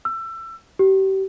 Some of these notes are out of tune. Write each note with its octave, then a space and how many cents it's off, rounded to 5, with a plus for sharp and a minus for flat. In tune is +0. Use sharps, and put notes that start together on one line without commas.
E6 +25
G4 -35